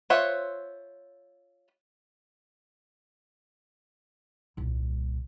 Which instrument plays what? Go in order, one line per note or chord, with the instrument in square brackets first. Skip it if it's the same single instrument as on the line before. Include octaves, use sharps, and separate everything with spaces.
[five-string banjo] F4 C5 C#5 E5 F#5
[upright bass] D#1 C2